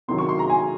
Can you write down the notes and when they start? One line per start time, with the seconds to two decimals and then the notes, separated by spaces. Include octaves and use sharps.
0.08 C3 D#3 F#3 C6
0.18 C#6
0.29 C6
0.39 A#5
0.50 G#5